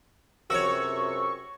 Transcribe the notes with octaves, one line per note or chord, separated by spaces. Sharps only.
C#2 F#2 C3 F#4 C#5 C#6 E6